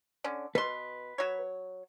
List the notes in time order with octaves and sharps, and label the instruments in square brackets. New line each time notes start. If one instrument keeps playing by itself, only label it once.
[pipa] D3 C#4
[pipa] B2 C6 [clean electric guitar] B4
[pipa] F#3 C#5